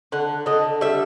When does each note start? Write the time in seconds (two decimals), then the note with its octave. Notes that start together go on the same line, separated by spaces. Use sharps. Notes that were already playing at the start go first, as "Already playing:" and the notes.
0.12 D3 F#5
0.46 D3 D#5
0.81 G3 E5